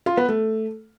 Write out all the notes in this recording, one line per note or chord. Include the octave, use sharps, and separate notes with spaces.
F4
B3
A3